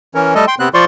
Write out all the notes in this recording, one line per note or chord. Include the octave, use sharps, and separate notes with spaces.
E3 C#4 A#4
G3 A3 A4 D#5
G5 C6
C3 B3 C4 F#6
F3 F4 C5 D5 C6 C#6